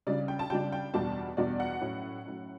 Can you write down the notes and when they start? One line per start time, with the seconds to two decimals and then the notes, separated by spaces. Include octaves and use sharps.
0.07 C#3 G3 D4 D5
0.28 G5
0.39 A5
0.50 C#3 G3 D4 G5
0.72 G5
0.94 E2 B2 G3 D4 A5
1.37 E2 B2 G3 D4 D5
1.60 F#5
1.81 A2 F#3 C#4
2.25 A2 F#3 C#4